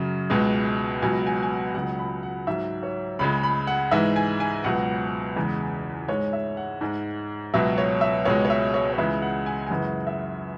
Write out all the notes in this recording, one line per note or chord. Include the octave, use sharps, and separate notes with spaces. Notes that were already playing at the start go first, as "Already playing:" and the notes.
Already playing: F#2 C#3 F#3
C#2 B2 G#3
C#2 B2 F#3 G#5
G#5
G#5
F#5
C#2 C#3 F#3 F#5
B5
F#5
G#2 F#3 E5
C#5
C#2 C#3 G#3 B5
B5
F#5
G#2 E3 G#3 E5
G#5
G#5
C#2 B2 F#3 F#5
E2 C#3 G#3
G#2 G#3 C#5
E5
F#5
G#2 G#3
C#2 B2 F#3 E5
C#5
E5
C#2 B2 G#3 C#5
C#5
E5
C#5
C#5
C#2 C#3 E3 G#3 E5
F#5
G#5
G#5
F#2 C#3 E3 G#3 F#5
E5